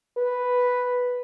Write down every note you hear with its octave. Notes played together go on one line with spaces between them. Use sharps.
B4